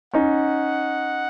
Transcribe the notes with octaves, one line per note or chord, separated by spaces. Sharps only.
C#4 D#4 F#5